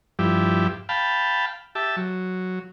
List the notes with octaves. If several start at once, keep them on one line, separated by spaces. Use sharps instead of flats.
G2 F3 E4 G4
F5 G5 A5 B5
G4 E5 A5
F#3